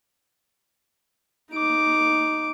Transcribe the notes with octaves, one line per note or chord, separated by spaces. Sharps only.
D#4 D6